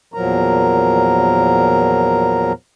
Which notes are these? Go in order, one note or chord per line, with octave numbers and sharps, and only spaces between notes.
E2 A#2 F3 F#3 A#4 A#5